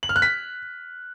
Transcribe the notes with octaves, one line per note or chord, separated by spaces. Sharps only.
F#7
F6
F#6
B6